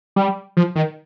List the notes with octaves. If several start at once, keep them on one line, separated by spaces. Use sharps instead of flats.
G3
F3
D#3